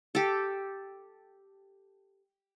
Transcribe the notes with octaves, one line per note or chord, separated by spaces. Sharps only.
G4 A4